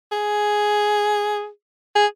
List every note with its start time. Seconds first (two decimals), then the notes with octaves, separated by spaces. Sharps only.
0.12 G#4
1.95 G#4